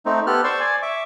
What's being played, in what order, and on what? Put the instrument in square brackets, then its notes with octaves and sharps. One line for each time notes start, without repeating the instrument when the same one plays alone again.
[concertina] A3 C4 D#4
B3 G4 A4 F6 F#6
C5 D5 C6 C#6 E6
D5 G#5
E5 C#6 D6